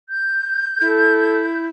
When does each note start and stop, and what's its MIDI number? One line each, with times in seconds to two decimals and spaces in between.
0.10 1.64 91
0.81 1.68 64
0.81 1.45 69